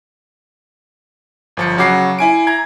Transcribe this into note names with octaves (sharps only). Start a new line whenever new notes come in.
G1 F3 C#7
C#3 F#3 F#4 D6 C7
E4 G#5 D7
A#5 G#6